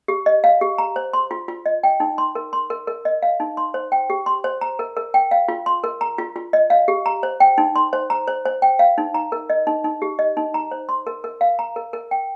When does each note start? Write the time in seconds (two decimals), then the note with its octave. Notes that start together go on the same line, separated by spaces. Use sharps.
0.08 G4
0.26 D#5
0.44 F5
0.61 G4
0.78 A#5
0.96 C5
1.13 C6
1.31 F4
1.48 F4
1.66 D#5
1.83 G5
2.00 D#4
2.18 C6
2.35 A#4
2.53 C6
2.70 A#4
2.87 A#4
3.05 D#5
3.23 F5
3.40 D#4
3.57 C6
3.74 C5
3.92 G5
4.10 G4
4.26 C6
4.44 C5
4.61 A#5
4.79 A#4
4.96 A#4
5.14 G5
5.31 F5
5.48 F4
5.66 C6
5.84 A#4
6.01 A#5
6.18 F4
6.36 F4
6.53 D#5
6.70 F5
6.88 G4
7.06 A#5
7.23 C5
7.40 G5
7.58 D#4
7.76 C6
7.93 C5
8.10 A#5
8.27 C5
8.45 C5
8.62 G5
8.79 F5
8.98 D#4
9.14 A#5
9.32 A#4
9.50 D#5
9.67 D#4
9.84 D#4
10.02 G4
10.19 D#5
10.37 D#4
10.54 A#5
10.71 C5
10.89 C6
11.07 A#4
11.24 A#4
11.41 F5
11.59 A#5
11.76 A#4
11.93 A#4
12.11 G5